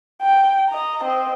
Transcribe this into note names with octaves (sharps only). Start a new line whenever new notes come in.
G5
D#5 A#5
C4 D#5